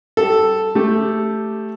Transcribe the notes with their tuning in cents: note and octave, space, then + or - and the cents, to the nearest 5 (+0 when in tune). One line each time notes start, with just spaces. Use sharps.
G3 -20 A4 +0
A3 +0 G4 +0